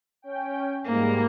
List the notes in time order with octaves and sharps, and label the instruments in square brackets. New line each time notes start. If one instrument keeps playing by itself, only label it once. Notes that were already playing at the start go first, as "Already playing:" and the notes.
[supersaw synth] C#4 G5
[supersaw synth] G#2 G3 [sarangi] A#3